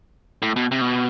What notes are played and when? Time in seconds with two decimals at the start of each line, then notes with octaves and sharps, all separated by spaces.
0.42 A2
0.56 B2
0.72 C3
0.81 B2